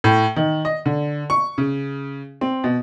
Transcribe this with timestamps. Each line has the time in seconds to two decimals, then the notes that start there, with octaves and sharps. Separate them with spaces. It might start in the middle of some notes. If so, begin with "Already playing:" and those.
0.04 A2
0.36 D#3
0.65 D#5
0.86 D3
1.30 C#6
1.58 C#3
2.41 C4
2.64 B2